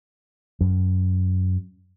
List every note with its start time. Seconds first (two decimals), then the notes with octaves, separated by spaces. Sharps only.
0.61 F#2